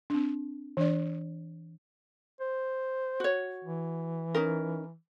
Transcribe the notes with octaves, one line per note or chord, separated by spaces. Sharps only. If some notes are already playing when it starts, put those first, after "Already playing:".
C4 D4
E3 D4 D5
C5
F#4 C#5
E3
C#4 D#4 A#4